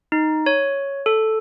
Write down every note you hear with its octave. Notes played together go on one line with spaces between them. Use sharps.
D#4
C#5
A4